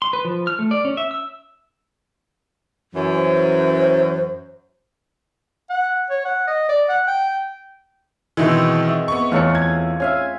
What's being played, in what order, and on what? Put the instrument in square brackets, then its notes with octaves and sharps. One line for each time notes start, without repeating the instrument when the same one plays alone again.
[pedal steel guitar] C6
B4
F3
F6
A3
D5
C#4
E5
E6
[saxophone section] F#2 E3
[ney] C5
[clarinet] F#5
C#5
F#5
D#5
D5
F#5
G5
[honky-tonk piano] B2 D#3 E3 [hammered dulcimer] G#3 C4 E4
[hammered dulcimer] E5
[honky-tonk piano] B3 C#6
[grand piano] E2 C#5 C#7 [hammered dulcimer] A3 F4
[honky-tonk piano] G#6
[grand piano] C#4 [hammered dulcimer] E5 F5 G#5